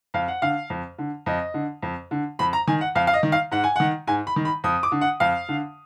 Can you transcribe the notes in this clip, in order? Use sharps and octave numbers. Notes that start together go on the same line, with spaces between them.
F2 F5
F#5
D3 F5
F2
D3
F2 D#5
D3
F2
D3
F2 B5
A#5
D#3 G#5
F#5
F2 F5
F5
D#5
D#3
F5
G#2 F#5
G#5
D#3 F#5
G#2 G#5
B5
D#3
B5
F2 D#6
D6
D3
F#5
F2 F5
D3